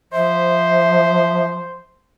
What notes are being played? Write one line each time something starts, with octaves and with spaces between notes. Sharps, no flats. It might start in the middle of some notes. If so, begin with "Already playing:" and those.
F3 C5 E5